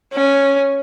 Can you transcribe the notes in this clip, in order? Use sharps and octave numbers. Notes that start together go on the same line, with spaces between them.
C#4